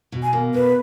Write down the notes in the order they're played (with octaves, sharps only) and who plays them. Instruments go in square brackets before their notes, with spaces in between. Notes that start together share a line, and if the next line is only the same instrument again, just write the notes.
[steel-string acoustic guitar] B2
[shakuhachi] G#5
[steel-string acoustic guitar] A#3
[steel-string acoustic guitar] B2 [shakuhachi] B4